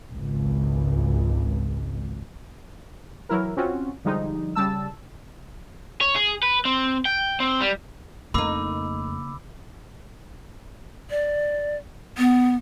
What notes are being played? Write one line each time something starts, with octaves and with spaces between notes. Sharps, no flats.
G#1 C#2
E3 F#3 E4 A#4
C4 C#4 F4 F#4
D3 F3 G3 G#3 D#4
C#3 G3 A5 E6
C#5
G#4
B4
C4
G5
C4
G3
F2 C#3 A3 A#3 D#4 B5 D6 E6
D5
B3